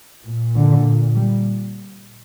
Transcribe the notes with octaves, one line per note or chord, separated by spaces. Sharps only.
A#2
D3
G3